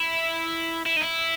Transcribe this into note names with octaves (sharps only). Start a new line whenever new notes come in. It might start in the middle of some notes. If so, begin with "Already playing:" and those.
Already playing: E4
E4
D#4
E4